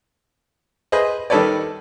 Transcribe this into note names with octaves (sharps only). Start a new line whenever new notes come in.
G#4 B4 C5 D#5
D#3 G3 A4 B4 C#5 D5